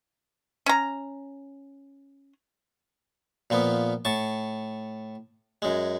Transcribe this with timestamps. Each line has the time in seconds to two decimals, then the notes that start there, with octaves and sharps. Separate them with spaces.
0.66 C#4 A#5
3.50 A#2 F3 B3
4.05 A2 A5 C#6
5.62 F#2 G#3